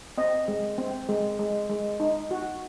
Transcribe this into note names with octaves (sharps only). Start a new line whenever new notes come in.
C4 D#5
G#3
C4
G#3
G#3
G#3
D#4
F#4